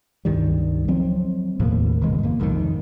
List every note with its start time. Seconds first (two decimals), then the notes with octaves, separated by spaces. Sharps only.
0.25 C#2 G2 D#3 G3
0.88 F3 F#3 C4
1.60 D#2 A2 C3 A#3
2.01 G1 C#3 E3 G#3
2.23 F#2 A#3
2.39 C2 F2 G#2 D#3